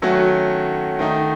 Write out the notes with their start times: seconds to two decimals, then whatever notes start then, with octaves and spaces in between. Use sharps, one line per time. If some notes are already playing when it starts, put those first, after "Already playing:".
0.02 D#3 F#3 A3 C#4 F#4
0.99 D#3 A3 D#4